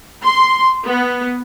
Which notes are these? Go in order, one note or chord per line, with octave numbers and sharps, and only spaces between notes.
C6
B3